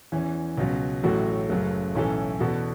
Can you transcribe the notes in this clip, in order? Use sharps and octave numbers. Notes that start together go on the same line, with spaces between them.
E2 E3 C#4
C#2 B2 F#3 C#4
A1 A2 F#3 A3 F#4
F#1 F#2 C#3 F#3 A3
B1 A2 E3 C#4 A4
E2 B2 B3 F#4 A4